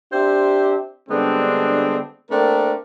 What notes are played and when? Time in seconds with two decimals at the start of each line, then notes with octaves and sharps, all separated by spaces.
0.12 C4 D4 G4 C5 E5
1.08 D3 G3 G#3 B3 C4 D4
2.29 A3 A#3 C4 D4 A#4